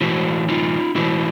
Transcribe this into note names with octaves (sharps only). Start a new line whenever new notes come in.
A2 E3 E4 F#4
D#4 F4
A2 E3 E4 F#4